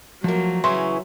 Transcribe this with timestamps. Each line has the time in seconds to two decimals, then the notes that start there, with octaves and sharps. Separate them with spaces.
0.24 F3 F#3 A3 A#3
0.64 C#3 E3 C#4 E5 C6